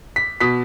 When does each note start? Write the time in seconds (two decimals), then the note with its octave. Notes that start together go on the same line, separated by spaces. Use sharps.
0.16 B6
0.41 B2 B6